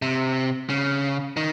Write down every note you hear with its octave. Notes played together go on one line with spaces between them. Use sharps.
C3
C#3
D#3